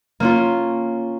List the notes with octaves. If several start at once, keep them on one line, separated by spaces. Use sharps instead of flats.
A#3 C#4 F4